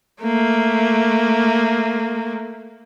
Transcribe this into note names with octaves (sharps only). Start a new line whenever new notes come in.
A3 A#3